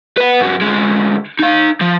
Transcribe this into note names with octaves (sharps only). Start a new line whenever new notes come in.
B4 F#5
G#2 F#3
D2 G#3
D#4 F5
F3